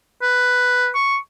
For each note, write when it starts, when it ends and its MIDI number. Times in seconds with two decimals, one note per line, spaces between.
0.22 0.90 71
0.95 1.17 85